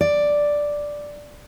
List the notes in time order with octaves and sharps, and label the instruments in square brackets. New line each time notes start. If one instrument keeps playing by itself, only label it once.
[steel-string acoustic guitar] D5